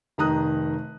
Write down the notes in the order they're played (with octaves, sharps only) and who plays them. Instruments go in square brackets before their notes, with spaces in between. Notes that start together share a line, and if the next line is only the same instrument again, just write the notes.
[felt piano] F1 D#3 A#5 D#6 F#6